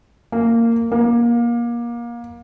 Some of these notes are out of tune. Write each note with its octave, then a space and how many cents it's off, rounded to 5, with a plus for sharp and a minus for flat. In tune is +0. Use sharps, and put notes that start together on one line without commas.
A#3 -15
A#3 +25